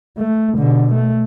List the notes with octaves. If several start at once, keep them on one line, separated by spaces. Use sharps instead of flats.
A3
B2 D3
A3